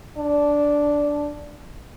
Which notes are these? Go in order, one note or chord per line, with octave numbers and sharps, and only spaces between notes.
D4